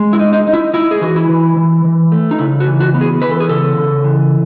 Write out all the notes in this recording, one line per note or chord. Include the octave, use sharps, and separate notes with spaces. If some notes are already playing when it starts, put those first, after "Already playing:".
Already playing: G#3
E4
D#4
D#4
D#4
E4
D#4 E4
G#4
E3 F#4
E4
E3
E3
E3
A3
D#4
C#3 E4
F#4
E3
F#4
B3
G#4
E3 B4
A4
G#4
C#3 A4
C#3
E3